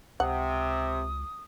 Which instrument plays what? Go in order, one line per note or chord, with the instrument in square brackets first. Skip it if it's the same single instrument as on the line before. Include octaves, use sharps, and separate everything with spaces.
[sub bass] C#2 [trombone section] C3 [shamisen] F#5 [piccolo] D#6